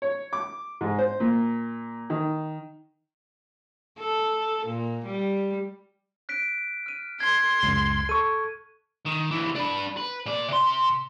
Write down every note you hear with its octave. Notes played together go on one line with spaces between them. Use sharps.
C#5
D6
G#2
C5
A#2
D#3
A4
A#2
G3
F#6 B6 D7
F6 D#7
C6 G#6
C#2 F#2
A4 C#6 D#7
D#3
C2 E3
D4 B4
B4
A#2 D5
C3 C6